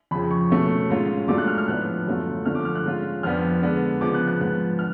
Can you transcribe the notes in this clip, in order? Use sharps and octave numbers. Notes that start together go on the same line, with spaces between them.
F2 C#3 F3 B5
C#6
B2 A3 C#4
G#2 G#3 C#4 F4
G#2 F#3 A3 D4 F4 D6
F#6
F6
F6
A2 F3 B3 D4 F#6
F#2 D3 F#3 A3 F4
D3 F3 A3 D4 F4 F6
D6
F6
F#6
G#2 G#3 C#4 F4
F2 F3 B3 D4 F6
D3 G#3 B3 D4
C#3 F3 B3 D6
F#6
F#6
G#2 F3 B3 F#6
D3 F6